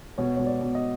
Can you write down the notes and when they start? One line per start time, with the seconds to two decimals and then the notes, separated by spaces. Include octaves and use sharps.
0.18 B2 C#5
0.36 B2 C#5
0.46 D5
0.61 B2
0.75 D#5